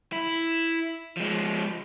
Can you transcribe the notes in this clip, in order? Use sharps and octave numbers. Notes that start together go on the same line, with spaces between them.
E4
F3 G#3